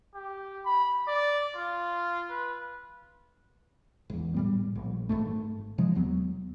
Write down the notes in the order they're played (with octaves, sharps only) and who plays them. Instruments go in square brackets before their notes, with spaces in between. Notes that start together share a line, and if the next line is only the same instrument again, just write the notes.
[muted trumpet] G4
B5
D5
F4
B4
[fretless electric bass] G#1 E2
A2 G3 B3
A#1
G#1 G#2 A3
C3 F3 G#3
D#2 F#3 B3